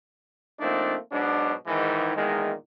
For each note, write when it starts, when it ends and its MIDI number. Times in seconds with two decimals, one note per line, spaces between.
0.60 0.97 53
0.60 0.97 57
0.60 0.97 58
0.60 0.97 60
0.60 0.97 62
0.60 0.97 63
1.12 1.52 44
1.12 1.52 47
1.12 1.52 54
1.12 1.52 62
1.67 2.16 44
1.67 2.16 51
1.67 2.16 52
2.17 2.54 40
2.17 2.54 46
2.17 2.54 51
2.17 2.54 52
2.17 2.54 56